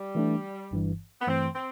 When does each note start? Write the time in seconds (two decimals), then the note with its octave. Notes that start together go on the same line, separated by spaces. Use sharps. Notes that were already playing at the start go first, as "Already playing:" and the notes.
Already playing: G3
0.15 E3 A3 D4
0.71 G1 G2 E3
1.21 B3
1.27 G2 E3 A3 C4
1.55 C4